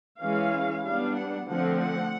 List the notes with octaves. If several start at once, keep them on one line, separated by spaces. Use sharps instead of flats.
E3 G#3 C#4 F5
G3 B3 D4 F5
F#5
D3 F3 A3 C4 F#5
F#5